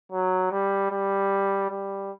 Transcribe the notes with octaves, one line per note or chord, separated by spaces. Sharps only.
F#3
G3
G3
G3